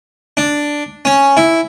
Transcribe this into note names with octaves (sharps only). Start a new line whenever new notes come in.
D4
C#4
E4